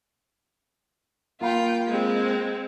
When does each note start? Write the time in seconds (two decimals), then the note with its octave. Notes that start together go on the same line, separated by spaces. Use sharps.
1.41 A#3 F4 F5 G5 B5
1.87 G#3 C4